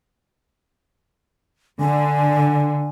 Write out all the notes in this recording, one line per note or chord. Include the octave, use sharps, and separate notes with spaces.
D3 G#5